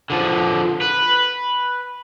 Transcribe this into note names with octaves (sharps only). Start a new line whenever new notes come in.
D3 F3
B4